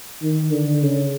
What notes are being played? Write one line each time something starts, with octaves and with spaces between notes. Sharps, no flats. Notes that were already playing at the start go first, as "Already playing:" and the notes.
D#3
D3
C#3